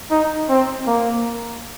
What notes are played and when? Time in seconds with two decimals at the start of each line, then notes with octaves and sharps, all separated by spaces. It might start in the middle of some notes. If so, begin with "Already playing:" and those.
0.11 D#4
0.49 C4
0.87 A#3